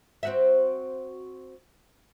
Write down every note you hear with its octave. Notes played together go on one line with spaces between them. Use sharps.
C4 F#4 E5